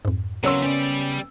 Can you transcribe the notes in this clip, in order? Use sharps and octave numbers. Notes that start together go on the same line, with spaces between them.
F2 G#2
C#3 F#3 B3 C#4 A#4 C#5 C6 E6
G3 C#4 D5